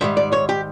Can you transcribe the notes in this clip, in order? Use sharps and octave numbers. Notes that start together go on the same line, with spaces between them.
G#2 D#3 G3 E5
D5
C#5
G4